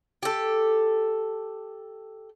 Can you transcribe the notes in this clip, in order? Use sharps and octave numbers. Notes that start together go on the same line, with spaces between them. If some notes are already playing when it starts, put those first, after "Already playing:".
G4 A4